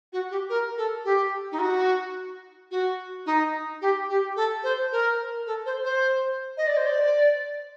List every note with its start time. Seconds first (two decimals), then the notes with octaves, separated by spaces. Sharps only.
0.12 F#4
0.30 G4
0.49 A#4
0.77 A4
1.04 G4
1.51 D#4
1.59 F#4
2.71 F#4
3.26 D#4
3.81 G4
4.09 G4
4.36 A4
4.63 C5
4.92 A#4
5.46 A4
5.65 C5
5.84 C5
6.57 D#5
6.67 D5
6.76 C5
6.86 D5